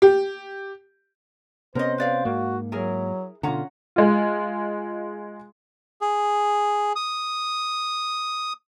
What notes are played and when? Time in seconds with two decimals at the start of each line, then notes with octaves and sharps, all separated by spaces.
0.02 G4
1.75 C3 B3 C#4 A#4 C5 D#5
1.98 B4 D5 F5
2.25 G#2 A#3 F#4
2.72 F#3 E4 G#4 A#4
3.43 B2 D3 C#4 F4 F#5 A#5
3.96 G#3 F4
6.01 G#4
6.95 D#6